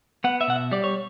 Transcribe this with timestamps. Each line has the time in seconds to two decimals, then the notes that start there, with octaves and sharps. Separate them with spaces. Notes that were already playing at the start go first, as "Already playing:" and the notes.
0.24 B3 F#5
0.41 E5
0.48 B2 F#5
0.56 E5
0.72 G3 D5
0.84 C#5